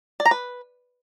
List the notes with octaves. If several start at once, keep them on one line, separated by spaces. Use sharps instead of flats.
D5
A#5
B4